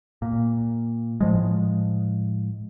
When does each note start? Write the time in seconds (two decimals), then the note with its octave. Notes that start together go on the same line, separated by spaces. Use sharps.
0.22 A#2
1.21 A2 F3 G#3